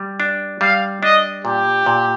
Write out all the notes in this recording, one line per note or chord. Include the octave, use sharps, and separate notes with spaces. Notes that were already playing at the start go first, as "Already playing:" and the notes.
Already playing: G3
D4
G3 F5
D4 D#5
A#2 G4
A#2